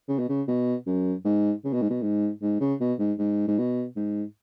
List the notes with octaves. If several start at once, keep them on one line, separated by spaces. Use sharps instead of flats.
C#3
B2
C#3
B2
F#2
G#2
C#3
B2
G#2
B2
G#2
G#2
C#3
B2
G#2
G#2
G#2
B2
G#2